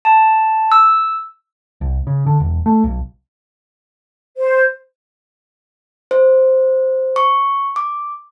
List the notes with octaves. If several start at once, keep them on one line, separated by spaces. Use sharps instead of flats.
A5
E6
C2
C#3
D3
E1
A3
B1
C5
C5
C#6
D6